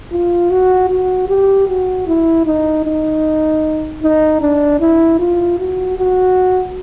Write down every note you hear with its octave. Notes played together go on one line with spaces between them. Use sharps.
F4
F#4
F#4
G4
F#4
E4
D#4
D#4
D#4
D4
E4
F4
F#4
F#4